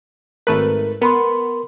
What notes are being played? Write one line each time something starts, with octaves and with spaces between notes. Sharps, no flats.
G#1 A3 A#4 B4
B3 A#4 B5 C6